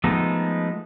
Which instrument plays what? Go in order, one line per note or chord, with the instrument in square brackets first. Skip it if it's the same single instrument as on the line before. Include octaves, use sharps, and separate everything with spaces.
[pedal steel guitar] F3 G#3 A3 B3 D#4